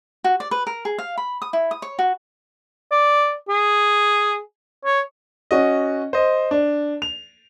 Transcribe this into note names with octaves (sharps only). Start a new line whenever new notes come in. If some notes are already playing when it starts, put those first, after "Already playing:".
F#4
D5
B4
A#4
G#4
F5
B5
D#6
E4
D#6
C#5
F#4
D5
G#4
C#5
C#4 F#4 D#5
C5 D#5
D4
F7